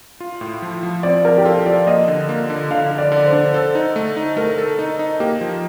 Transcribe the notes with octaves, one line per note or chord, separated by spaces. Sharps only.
F4
A2
F3
F3
C4 D5
F3 A#4
G4
F4 A4
F3 D5
A#3 D#5
D3
A#3
D3
D3 F5
D3
D5
D3
C5
D3
A4 C5
D#4
A3
D#4
A3 A#4
A4
D#4
D#4
A#3 G4
F3